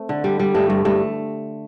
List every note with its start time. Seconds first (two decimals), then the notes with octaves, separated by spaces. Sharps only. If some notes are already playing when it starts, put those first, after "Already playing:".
Already playing: A3 C4
0.09 D3
0.24 G3
0.39 G3
0.55 G2 A3
0.70 G2
0.85 G2 A3